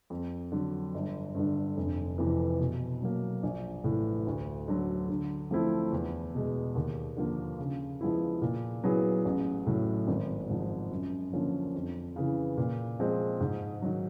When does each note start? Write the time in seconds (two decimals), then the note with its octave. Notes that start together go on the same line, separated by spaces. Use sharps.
0.10 F2
0.52 D3 F#3
0.94 G1
1.35 G2 D3
1.77 F1
2.18 F2 C3 E3
2.60 B2
3.02 F#3 A#3
3.43 A#1
3.84 A2 E3
4.27 D2
4.68 D3 F#3
5.09 D3
5.51 F3 A3 C4 E4
5.92 E2
6.34 B2 G#3
6.75 D#2
7.17 D3 F3 A#3
7.58 C#3
8.01 F3 G#3 B3 E4
8.42 A#2
8.84 F#3 B3 E4 G#4
9.25 A1
9.66 A2 F#3
10.08 G#1
10.50 G#2 F3
10.92 F#2
11.33 D3 F3 A#3 C#4
11.75 F2
12.16 C#3 E3
12.57 A#2
13.00 F3 G#3 C4
13.40 G#2
13.82 D#3 F#3